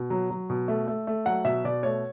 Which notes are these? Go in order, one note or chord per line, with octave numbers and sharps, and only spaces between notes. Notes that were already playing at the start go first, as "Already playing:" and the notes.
Already playing: B2
F#3
F#3
B2
A3
A3
A3
F#3 F#5
B2 E5
B2 D5
A3 C#5